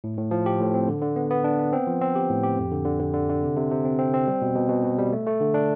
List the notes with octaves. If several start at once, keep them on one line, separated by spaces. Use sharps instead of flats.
A2
A2
F3
G4
A2
C4
D3
D3
B3
B3
D4
B3
C4
F3
C4
G4
A2
G4
F2
D3
D3
D3
D3
D3
C3
C3
C3
C4
C4
C4
G3
B2
B2
B2
B2
G3
A3
A3
D3
D4